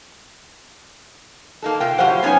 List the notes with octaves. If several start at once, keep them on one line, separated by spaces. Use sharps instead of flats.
A#3 D#4 A4
C3 F4 G5
A2 F#3 F4 G4 C5 F#5
B3 C#4 D#4 A4 C#5 G#5